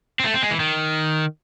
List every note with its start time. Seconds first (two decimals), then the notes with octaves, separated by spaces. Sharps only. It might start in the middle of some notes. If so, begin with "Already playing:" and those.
0.20 C4
0.25 A3
0.34 C4
0.43 G#3
0.51 E3
0.60 D#3